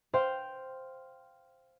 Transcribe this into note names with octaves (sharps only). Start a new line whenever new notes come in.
C5 F5 G5